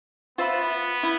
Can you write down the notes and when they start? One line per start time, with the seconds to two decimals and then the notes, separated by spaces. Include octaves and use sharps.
0.38 B3 F4 C5 E5 B5
1.03 E4